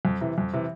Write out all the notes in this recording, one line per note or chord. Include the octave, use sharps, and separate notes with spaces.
F2
C3 E3
F2
C3 E3